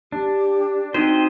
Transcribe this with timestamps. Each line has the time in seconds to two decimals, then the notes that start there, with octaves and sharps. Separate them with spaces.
0.12 D4 G4
0.94 C4 D#4 F#4 C5 D#5 G5